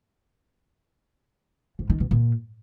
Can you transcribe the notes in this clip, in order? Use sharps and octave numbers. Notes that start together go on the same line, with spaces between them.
G#2
D#3
B2
A#2